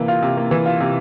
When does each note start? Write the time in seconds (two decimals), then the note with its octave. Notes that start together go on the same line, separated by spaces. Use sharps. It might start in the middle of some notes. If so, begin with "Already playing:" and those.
Already playing: C3 E3 A#3
0.08 F4
0.22 C3
0.37 A#3
0.51 E3
0.66 F4
0.80 C3